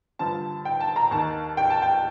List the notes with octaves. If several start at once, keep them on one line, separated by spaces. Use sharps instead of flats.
G2 D3 F3 A5
G5
A5
A#5
D#2 D#3 A5
G5
A5
G5